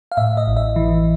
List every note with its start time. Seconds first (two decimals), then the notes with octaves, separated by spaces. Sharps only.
0.12 F5
0.17 A2 E5
0.37 D#5
0.47 A1
0.57 E5
0.76 E3